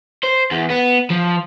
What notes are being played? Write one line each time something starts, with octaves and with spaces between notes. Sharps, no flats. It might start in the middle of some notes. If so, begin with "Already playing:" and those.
C5
E2
B3
F3